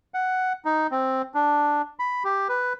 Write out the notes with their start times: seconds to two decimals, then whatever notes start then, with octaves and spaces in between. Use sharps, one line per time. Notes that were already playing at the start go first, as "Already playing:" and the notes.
0.14 F#5
0.65 D#4
0.91 C4
1.34 D4
1.99 B5
2.24 G4
2.49 B4